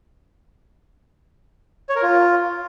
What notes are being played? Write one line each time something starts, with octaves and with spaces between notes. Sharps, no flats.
C#5
A#4
F4